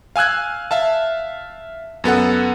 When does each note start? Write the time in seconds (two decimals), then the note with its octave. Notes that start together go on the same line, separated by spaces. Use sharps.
0.16 F5 G#5 E6 F#6 G#6
0.71 E5 F5 A5
2.04 F#2 B3 A4 F#5